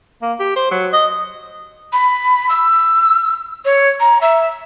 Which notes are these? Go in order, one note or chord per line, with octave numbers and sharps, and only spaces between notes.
A#3
G4
C5
F#3
D#5
B5
E6
C#5
A#5
E5